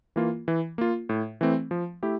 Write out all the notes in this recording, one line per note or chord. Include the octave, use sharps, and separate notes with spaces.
E3 A#3 F4
E3
A#3 F4
A2
E3 A3 C4
F3
A3 E4 G4